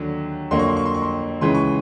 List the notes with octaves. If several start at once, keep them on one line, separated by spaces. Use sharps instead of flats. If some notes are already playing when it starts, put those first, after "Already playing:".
Already playing: D#2 D3 F#3
F2 D3 F#3 A#3 C6
C#6
C6
C#6
C6
C#6
C6
C#2 C#3 E3 G#3 C#4 C6
C#6